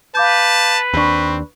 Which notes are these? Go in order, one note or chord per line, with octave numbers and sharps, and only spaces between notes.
B4 F5 A5 D6 G6
D#2 C4 D4 B5 C#6